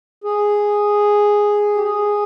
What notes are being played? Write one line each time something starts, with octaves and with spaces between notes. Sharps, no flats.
G#4
G4
G#4